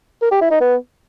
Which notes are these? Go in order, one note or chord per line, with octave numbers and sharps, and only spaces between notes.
A#4
G4
E4
D#4
B3